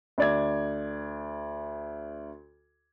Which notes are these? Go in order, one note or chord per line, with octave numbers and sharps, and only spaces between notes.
D2 D5 G#6